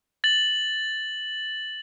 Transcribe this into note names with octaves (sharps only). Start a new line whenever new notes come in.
A6 F#7